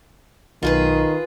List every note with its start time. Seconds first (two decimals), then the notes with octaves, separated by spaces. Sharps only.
0.63 B1 D#3 F4 G#4 B4